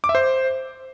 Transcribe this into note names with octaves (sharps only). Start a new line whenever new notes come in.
D6
E5
C5